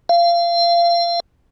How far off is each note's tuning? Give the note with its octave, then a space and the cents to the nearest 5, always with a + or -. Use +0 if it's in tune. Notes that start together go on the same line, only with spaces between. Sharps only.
F5 -25